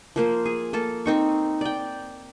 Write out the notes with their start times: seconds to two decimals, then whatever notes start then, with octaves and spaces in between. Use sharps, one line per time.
0.16 F3 A#3 C5
0.46 G#4
0.73 A#3 A4 A5
1.06 C4 D#4 C#6
1.61 D5 G5